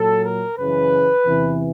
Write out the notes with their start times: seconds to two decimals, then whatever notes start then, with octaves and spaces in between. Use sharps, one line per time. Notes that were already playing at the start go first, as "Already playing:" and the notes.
Already playing: A#2 F#3 A4
0.25 A#4
0.58 F#2 C#3 E3 B4
1.24 E2 C3 E3